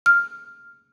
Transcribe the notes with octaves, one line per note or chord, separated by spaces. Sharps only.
F6